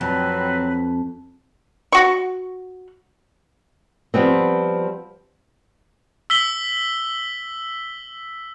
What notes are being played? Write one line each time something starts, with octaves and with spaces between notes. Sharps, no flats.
F2 F#3 C4 B4
F#4 C#6
F3 G3 B3 C4
E6 B6 G7